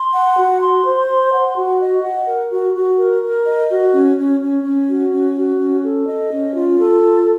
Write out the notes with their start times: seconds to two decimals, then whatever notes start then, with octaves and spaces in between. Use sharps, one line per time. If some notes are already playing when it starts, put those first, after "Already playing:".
Already playing: C6
0.13 F#5
0.37 F#4
0.60 C6
0.84 C5
1.08 C6
1.32 F#5
1.56 F#4
1.80 D#5
2.03 F#5
2.27 A#4
2.51 F#4
2.75 F#4
2.98 A#4
3.22 A#4
3.46 D#5
3.70 F#4
3.93 C#4
4.17 C#4
4.41 C#4
4.64 C#4
4.89 F#4
5.12 C#4
5.36 F#4
5.59 C#4
5.83 A4
6.07 D#5
6.31 C#4
6.54 F4
6.79 A4
7.02 F4